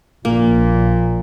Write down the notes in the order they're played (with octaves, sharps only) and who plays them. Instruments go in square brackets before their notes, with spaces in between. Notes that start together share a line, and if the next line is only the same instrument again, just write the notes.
[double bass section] A#1 [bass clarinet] A#2 [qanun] A#3